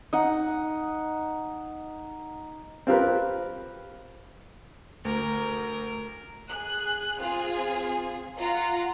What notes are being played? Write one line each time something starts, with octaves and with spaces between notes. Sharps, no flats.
D#4 F#5
C4 F4 G4 A#4 B4
D2 A#4
G#4 F#6
C4 F4 G#4
F4 F#5 A#5